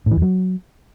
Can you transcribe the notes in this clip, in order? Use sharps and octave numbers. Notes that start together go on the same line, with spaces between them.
A2
E3
E2
F#3